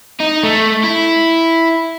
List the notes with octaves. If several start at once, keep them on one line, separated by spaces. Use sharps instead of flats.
D#4
A3
E4